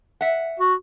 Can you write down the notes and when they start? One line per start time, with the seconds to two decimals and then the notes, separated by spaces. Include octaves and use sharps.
0.21 E5 F#5
0.60 F#4